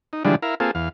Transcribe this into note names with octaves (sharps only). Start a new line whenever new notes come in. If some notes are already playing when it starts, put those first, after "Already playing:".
D#4
D3 E3 F3 G3 G#3 D4
E4 A#4 F5
A#3 C4 F4 G#4 A4
E2 F5